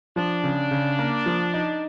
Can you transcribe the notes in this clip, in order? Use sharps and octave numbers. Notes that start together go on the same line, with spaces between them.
F3 D4
C#3
C#3
A#3
F3
D#4